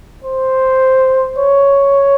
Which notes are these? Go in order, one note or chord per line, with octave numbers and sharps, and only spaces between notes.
C5
C#5